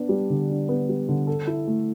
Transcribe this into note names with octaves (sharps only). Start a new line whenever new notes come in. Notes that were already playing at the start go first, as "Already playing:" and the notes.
Already playing: B3 D4
G3
D3
D4
B3
G3
D3
A4
E4
A3